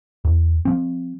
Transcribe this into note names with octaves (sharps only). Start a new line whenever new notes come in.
E2
F3 C4